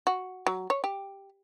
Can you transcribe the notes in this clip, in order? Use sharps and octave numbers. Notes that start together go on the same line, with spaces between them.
F#4
F#3
C#5
G4